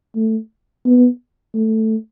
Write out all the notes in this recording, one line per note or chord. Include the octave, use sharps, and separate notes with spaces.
A3
B3
A3